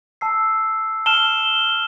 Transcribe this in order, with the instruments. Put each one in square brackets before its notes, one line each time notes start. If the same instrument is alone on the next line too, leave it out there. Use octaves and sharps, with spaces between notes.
[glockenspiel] A5 E6 C7
[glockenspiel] A5 [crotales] F6 E7 G7